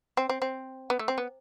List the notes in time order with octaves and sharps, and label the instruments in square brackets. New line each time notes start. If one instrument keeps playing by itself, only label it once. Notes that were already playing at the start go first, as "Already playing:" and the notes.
[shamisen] C4
C4
C4
B3
A3
C4
B3